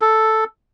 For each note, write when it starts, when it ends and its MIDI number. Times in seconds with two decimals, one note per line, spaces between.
0.01 0.44 69